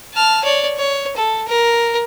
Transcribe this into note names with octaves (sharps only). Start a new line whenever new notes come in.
A5 F6
C#5 D5
C#5
A4
A#4